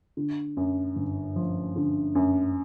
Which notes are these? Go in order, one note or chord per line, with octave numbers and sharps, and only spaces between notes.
D3
F#2
G1
F3
D3
F#2